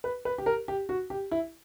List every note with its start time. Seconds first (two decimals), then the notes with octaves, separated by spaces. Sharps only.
0.04 B4
0.25 B4
0.38 G4
0.46 A#4
0.68 G4
0.89 F#4
1.10 G4
1.31 E4